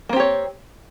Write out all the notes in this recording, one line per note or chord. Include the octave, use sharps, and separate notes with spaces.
A#3 C4 G4 C#5